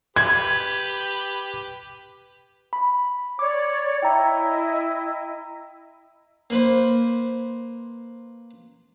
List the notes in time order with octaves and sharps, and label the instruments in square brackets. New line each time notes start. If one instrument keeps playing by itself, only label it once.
[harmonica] G4 B4 [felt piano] G#6
[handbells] B5
[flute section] C#5 D5 [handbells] D6
[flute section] E4 D#5 [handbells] G5 A#5
[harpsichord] A#3 B4 C5